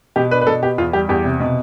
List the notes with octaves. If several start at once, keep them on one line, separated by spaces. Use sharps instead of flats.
B2 G4
D4 B4
B4
B2 A4
B3 G4
E2 F4
G3 G4
E2 G4
C3
B2